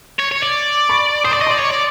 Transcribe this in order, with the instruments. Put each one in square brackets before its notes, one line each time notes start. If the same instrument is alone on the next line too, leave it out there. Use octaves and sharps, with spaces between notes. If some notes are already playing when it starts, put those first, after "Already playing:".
[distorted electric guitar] C#5
C#5
D5
[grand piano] B5 C#6
[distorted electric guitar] C5 [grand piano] D#6
[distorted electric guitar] D5 [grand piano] D6
[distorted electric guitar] D#5 [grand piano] C#6
[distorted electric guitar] D5 [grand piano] C6 D6
[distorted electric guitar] C#5
D5